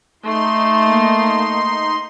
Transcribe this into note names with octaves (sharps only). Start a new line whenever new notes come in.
A3 D#4 C6
A#3